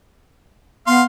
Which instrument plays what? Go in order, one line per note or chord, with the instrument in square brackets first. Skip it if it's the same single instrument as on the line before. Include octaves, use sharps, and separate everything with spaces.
[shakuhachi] B3 [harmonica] F5 C6